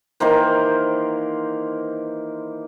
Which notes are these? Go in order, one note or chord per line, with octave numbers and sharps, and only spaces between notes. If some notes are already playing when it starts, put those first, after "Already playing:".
D#3 E3 A#3 C5